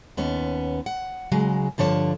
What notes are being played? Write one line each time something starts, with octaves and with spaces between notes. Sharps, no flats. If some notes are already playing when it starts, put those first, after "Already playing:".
D#2 B3 C#4
F#5
C#3 F#3 G#3
G2 D3 F3 C#5 A5